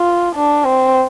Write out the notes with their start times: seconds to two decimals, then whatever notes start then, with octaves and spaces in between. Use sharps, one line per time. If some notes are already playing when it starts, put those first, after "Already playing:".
Already playing: F4
0.35 D4
0.66 C4